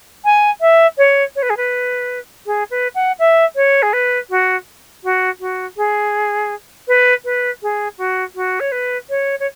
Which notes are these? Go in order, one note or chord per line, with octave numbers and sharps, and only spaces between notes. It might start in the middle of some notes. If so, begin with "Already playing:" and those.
G#5
E5
C#5
C#5
B4
G#4
B4
G#4
B4
F#5
E5
C#5
G#4
B4
F#4
F#4
F#4
G#4
B4
B4
G#4
F#4
F#4
C#5
B4
C#5
C#5